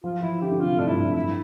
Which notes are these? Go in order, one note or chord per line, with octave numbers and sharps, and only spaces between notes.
F3 F4
E3 E4
D3 G4
D3
C3 F4
A2 D4
G2 E4
F2
G2 E4